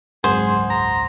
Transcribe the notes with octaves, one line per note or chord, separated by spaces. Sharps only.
G#1 C#2 F#2 G#4 C5 F#5 C6 D#6
A#5